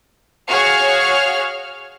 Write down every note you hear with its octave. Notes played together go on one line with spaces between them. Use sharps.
F#4 G#4 C#5 F5 F6